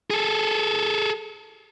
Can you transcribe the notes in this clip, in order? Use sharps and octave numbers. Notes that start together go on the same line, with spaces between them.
G#4 A4